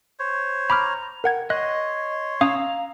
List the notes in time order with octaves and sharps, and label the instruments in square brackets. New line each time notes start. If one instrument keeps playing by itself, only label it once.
[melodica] C5 C#5
[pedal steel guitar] A#5 [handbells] B5 D6 F6
[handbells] A#4 F#5 G#6 [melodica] G5
[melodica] C#5 C6 [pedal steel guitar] D#5 [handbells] F#6
[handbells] C#4 D#6 G#6 [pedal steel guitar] F5 A#5 E6